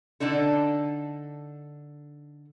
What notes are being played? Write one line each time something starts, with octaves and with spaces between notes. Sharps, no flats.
D3 D4 D#4 A4